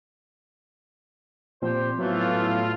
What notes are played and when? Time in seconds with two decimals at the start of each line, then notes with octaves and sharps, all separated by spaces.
1.62 A#2 F3 C4 G4 C5
1.98 A2 E3 F#3 A3 B3 F4